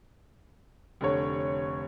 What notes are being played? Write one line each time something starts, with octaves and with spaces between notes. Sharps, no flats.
F1 D3 C#5